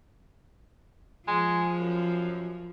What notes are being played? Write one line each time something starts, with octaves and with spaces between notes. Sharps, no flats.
F3 G#3
F#2